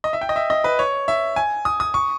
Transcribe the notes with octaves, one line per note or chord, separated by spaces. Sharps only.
D#5
E5
G5
D#5
E5
D#5
B4
C#5
E5
G#5
D#6
D#6
C#6